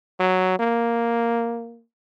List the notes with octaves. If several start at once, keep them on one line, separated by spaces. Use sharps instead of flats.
F#3
A#3